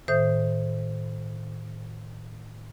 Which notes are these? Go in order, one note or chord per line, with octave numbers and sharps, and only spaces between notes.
A2 D#3 C5 E5 D#6 G6